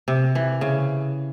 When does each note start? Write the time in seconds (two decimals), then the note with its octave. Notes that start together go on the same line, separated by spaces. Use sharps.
0.08 C3
0.35 E3
0.61 C#3